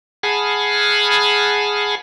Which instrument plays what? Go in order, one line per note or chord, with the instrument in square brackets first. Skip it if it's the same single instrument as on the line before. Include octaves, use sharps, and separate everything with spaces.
[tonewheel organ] G#4 F#5 G#5 A5 B5 F6